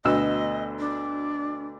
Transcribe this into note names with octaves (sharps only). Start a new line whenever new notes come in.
D2 B2 D#5 E6
D4